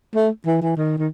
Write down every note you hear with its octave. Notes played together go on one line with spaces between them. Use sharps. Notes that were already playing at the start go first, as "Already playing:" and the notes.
A3
E3
E3
D#3
D#3